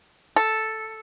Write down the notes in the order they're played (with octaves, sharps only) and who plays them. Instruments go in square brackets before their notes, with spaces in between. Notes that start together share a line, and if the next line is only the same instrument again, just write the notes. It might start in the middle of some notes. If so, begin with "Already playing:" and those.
[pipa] A4